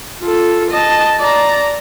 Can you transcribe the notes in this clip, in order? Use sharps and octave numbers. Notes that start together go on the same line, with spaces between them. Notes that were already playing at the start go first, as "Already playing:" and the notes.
F4 A4
D#5 A5
D5 A#5